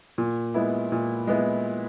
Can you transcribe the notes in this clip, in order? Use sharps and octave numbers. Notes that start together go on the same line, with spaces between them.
A#2
G#3 B3 E4
A#2
G#3 B3 E4